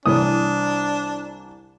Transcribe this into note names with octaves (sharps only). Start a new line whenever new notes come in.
C2 E3 D4 D#6